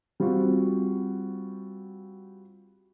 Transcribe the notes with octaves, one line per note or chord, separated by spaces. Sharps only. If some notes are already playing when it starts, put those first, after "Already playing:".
G3 C4 F4 F#4